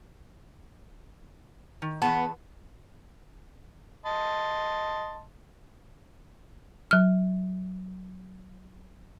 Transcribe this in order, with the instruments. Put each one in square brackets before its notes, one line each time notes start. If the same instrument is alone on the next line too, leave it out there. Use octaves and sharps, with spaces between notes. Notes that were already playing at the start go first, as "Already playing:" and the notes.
[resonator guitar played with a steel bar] D#3
[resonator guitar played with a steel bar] E2 G#4 A5 [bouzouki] B3
[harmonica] D#5 A5 C6
[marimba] F#3 F6